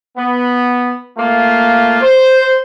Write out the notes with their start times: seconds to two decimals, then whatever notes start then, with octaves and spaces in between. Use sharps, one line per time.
0.16 B3
1.17 A3 A#3 F4
2.01 C5